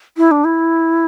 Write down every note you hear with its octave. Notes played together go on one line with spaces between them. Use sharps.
E4
D4
E4